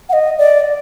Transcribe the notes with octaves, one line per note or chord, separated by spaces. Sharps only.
F#5
D#5
D5